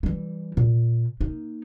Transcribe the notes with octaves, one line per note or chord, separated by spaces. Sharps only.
E3 G3
A#2
A#3 D#4